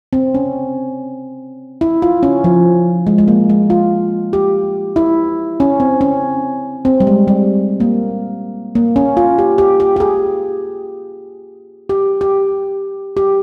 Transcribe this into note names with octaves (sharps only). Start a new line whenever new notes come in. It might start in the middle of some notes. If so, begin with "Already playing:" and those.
C4
C#4
E4
F4
C#4
F3
G#3
G#3
A#3
G#3
F4
G4
E4
C#4
C4
C#4
C4
G3
G#3
G3
A#3
A#3
C#4
F4
G4
G4
G4
G4
G#4
G4
G4
G4